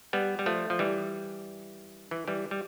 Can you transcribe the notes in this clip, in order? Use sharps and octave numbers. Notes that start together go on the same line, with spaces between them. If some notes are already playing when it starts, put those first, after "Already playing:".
G3 B3
G3
F3 A3
F3
E3 G3
E3
E3 G3
G3